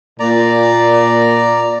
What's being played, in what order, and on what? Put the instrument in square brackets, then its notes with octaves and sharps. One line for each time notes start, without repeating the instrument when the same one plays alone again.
[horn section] A#2 [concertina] D5 A#5